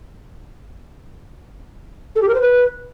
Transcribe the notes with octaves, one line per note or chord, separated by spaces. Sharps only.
A4
G4
A#4
C5
B4